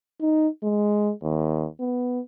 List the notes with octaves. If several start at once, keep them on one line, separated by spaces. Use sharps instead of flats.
D#4
G#3
D#2
B3